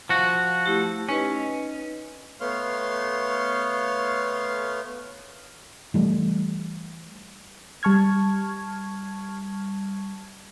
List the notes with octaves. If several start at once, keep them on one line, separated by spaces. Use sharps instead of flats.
F3 F#4
A3 E4 G4
C#4 D#4 B4 D#5
A3 B3 C#5 F5 C6 F6
E3 G3 A3
G3 A5 C#6 F6 G#6